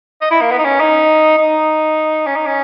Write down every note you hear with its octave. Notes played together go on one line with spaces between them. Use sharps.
D#5
E4
A#3
B3
D#4
C#4
D#4
D#4
C#4
D#4
C#4